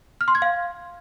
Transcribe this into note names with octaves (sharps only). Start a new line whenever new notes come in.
F6
C6
G#6
F5